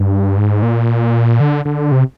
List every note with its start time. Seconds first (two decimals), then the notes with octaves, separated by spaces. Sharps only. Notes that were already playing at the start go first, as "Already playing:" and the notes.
Already playing: G2
0.38 G#2
0.62 A#2
1.40 D3
1.65 D3
1.92 C3